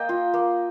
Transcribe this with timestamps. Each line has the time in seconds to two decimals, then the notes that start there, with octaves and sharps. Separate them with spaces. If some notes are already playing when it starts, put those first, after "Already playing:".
Already playing: A#3 D#5 G5
0.09 F4
0.34 A#3